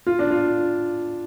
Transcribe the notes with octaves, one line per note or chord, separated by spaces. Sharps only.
F4
D4
F4